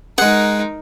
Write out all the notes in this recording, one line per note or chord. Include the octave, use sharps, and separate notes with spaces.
G#3 D#4 G#4 A#4 F#5